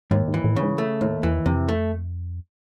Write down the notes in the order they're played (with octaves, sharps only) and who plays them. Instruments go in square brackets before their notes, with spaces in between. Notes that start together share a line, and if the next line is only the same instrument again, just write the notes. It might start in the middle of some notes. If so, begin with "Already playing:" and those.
[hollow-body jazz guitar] D#2 [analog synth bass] G#2
[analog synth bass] G#2
[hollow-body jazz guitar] E3
[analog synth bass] A2
[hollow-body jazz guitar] C#3
[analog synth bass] G#2
[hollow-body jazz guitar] A3
[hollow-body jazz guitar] D#2 [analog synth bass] A2
[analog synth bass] E2 [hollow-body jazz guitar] E3
[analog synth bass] F2 [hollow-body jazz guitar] C3
[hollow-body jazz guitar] A3